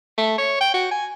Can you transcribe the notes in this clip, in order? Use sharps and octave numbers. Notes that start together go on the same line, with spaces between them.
A3
C#5
G5
F#4
G#5